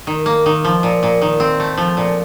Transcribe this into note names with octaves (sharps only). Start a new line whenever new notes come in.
D#3
A#3
D#3
F3
A#2
A#2
D#3
C4
A3
F3
A#2